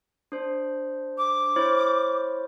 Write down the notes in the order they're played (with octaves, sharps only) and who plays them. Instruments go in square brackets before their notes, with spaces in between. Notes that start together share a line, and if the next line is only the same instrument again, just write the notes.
[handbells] D4 C5
[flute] D6
[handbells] E4 C5 C#5